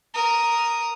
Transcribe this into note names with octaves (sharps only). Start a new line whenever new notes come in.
A#4 D#6